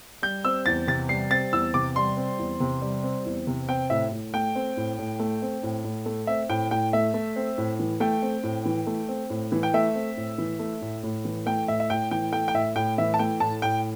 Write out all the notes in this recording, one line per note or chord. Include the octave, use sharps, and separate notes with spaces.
G3 G6
C4 E6
E2 A6
C3 A6
G3 C7
C4 A6
E2 E6
C3 D6
G3 C6
C4
E2
C3
G3
C4
E2
C3
C4 G5
A2 E5
A2
A3 G5
C4
A2
A2
A3
C4
A2
A2
A3
C4 E5
A2 G5
A2 G5
A3 E5
A3
C4
A2
E3
A3 G5
C4
A2
E3
A3
C4
A2
E3
G5
A3 E5
C4
A2
E3
A3
A2
A2
E3
A3 G5
A2 E5
E5
A2 G5
E3 G5
A3 G5
G5
A2 E5
A2 G5
E3 E5
A5
A3 G5
A2 A5
A2 G5